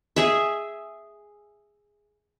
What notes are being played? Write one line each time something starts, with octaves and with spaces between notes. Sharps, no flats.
G#4 E5